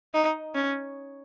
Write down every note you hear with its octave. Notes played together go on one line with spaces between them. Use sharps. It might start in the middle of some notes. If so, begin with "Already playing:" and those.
D#4
C#4